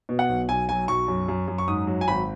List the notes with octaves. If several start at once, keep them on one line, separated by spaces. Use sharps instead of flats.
B2
F#5
B1
B1 G#5
F#3 G#5
B1 C#6
F#2
F#2
F#2
C#6
G#2 D#6
F#3
G#5
G#1 B5